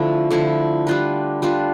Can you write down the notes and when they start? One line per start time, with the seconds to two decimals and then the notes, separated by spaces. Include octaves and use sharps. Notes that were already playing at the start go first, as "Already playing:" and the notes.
Already playing: D3 F3 A3 E4
0.31 D3 F3 A3 E4
0.87 G3 D4 F4 B4
1.42 G3 D4 F4 B4